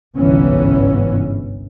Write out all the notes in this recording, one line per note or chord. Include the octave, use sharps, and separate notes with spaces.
G1 C2 G#2 E3 B3 C#4